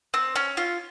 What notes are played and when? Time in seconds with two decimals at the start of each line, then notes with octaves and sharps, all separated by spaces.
0.14 C4
0.36 C#4
0.57 F4